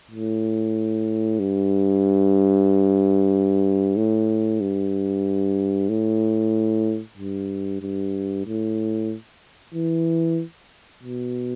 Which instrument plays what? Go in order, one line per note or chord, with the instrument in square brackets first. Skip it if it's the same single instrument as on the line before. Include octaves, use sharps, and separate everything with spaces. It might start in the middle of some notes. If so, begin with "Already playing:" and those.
[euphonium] A2
G2
A2
G2
A2
G2
G2
A2
E3
B2